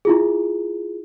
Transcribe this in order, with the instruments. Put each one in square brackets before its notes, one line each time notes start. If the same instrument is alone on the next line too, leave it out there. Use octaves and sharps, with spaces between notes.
[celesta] E4 F4 G#4